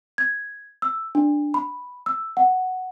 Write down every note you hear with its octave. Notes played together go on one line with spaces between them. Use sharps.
G#6
E6
D4
B5
E6
F#5